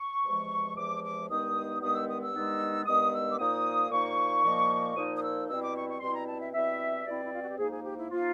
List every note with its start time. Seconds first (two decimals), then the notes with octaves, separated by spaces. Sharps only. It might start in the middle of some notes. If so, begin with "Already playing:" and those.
Already playing: C#6
0.24 E2 C3 F3 G#3
0.76 E2 C3 F3 G#3 D6
1.04 D6
1.29 G2 D#3 G#3 B3 D#4 D#6
1.82 G2 D#3 G#3 B3 D#4 D#6
1.94 E6
2.08 D#6
2.21 E6
2.33 G2 D#3 G#3 B3 D#4
2.86 G2 D#3 G#3 B3 D#4 D#6
3.13 E6
3.31 D6
3.38 A#2 F3 A#3 D#4 D#6
3.91 A#2 F3 A#3 D#4 C#6
4.44 A#2 F3 A#3 D#4
4.96 A#2 F3 A#3 D#4 D#6
5.16 D#6
5.23 E6
5.48 B2 G3 C4 E4 E6
5.62 D6
5.75 C#6
5.88 C#6
6.00 B2 G3 C4 E4 C6
6.14 A#5
6.27 A5
6.40 E5
6.53 B2 G3 C4 E4 E5
7.05 B2 G3 C4 E4 D5
7.24 E4
7.34 F4
7.42 F#4
7.50 G4
7.58 G#2 F3 A#3 D#4 G#4
7.71 G#4
7.84 G4
7.97 E4
8.11 F3 A#3 D#4 F4